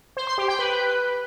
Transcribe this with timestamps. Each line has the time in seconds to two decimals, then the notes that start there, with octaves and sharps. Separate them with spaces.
0.17 C5
0.27 C6
0.38 G4
0.48 G5
0.59 B4